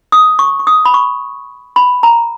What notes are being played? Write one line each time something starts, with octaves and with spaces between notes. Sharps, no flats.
D#6
C#6
C#6
D#6
B5
C#6
B5
A#5